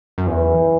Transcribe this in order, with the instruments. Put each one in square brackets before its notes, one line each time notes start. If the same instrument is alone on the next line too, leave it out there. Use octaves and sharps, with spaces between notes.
[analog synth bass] F#2
[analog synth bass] E2 [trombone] E3